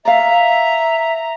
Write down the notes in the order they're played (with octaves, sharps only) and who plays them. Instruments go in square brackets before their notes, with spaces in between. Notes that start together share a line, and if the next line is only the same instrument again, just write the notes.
[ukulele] D5 F5 [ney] E5 [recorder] A#5